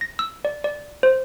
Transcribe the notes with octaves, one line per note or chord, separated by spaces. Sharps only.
A#6
E6
D5
D5
C5